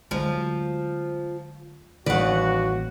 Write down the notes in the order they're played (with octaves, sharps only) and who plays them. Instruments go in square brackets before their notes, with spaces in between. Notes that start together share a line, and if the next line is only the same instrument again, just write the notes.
[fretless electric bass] D2 F#3 G#3 [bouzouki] F3
[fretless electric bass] A1 E3 G3 [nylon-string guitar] D#2 D5 [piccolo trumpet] F#4 [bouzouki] B4 F#5